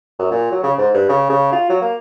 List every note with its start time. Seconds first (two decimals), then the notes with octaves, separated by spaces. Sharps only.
0.19 F#2
0.31 A#2
0.51 F#3
0.63 C#3
0.78 G#2
0.94 G2
1.09 C#3
1.30 C#3
1.53 F4
1.69 F#3
1.82 A#3